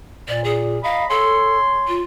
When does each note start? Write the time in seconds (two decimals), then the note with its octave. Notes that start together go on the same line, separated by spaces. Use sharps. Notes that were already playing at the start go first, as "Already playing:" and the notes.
0.28 A#2 D5
0.44 G#4
0.83 D#5 F5 A#5 B5
1.10 A4 C#5 G#5 C6
1.88 F4